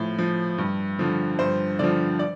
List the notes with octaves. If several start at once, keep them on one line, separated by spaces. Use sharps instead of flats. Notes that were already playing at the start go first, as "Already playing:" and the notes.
Already playing: A2 F3
F3
G2
D3 F3
G2 C5
D3 F3 D5
D5